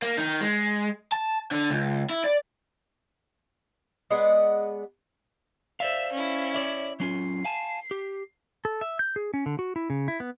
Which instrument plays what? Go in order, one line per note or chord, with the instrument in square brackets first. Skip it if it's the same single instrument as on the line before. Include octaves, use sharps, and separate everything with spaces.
[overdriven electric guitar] A#3
D#3
G#3
A5
D3
C#2
E4
D5
[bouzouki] G#3 B3 D5 F#5
[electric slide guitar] C5 D5 F5 [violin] E5 E6
[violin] C#4 E4
[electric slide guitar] C#5 D5 E5
[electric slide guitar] F#3 C#4 F4 [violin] C7
[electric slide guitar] F5 G#5 A5
G4
[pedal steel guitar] A4
E5
G6
G#4
C#4
D3
F#4
E4
C#3
E4
B3